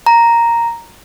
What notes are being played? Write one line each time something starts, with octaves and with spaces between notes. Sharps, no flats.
A#5